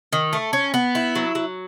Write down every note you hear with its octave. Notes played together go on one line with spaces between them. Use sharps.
D#3
A3
C#4
B3
E4
F#3
F#3